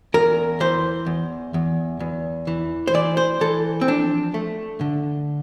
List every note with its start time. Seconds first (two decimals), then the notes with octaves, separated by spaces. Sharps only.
0.14 E2 A#4
0.60 E3 C5
1.06 E2
1.54 E2
2.00 E2
2.47 E3
2.87 C5
2.94 E3 D5
3.17 C5
3.41 E3 A4
3.81 C4
3.88 F3 D4
4.34 A3
4.81 D3